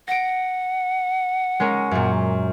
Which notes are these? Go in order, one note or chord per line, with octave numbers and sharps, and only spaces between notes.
F#5 A#6 D7
G#3 C#4 A#4
F#2 A#2